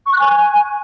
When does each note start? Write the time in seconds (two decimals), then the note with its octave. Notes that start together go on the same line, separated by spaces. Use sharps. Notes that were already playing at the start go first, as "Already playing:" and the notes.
0.05 C#6
0.12 F#6
0.19 G#5